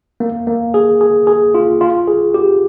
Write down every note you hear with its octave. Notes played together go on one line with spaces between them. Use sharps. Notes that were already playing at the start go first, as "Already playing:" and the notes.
A#3
A#3
G#4
G#4
G#4
F4
F4
G#4
G4